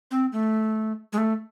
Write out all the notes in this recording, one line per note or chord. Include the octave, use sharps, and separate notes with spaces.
C4
A3
G#3
A3